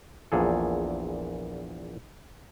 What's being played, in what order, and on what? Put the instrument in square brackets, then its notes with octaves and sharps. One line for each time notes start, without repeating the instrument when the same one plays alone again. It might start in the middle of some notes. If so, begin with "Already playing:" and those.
[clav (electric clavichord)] A#1 E2 A#2 G#4 A4